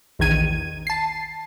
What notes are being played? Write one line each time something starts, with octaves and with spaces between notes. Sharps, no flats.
A#1 E2 D#3 G#6 D#7
A5 C7